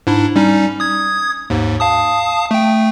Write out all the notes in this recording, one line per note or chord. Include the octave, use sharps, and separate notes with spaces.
G#2 D4 E4
G3 C#4 D#4
D#6 G#6
D#2 G#2
F5 A5 D#6
A3 G5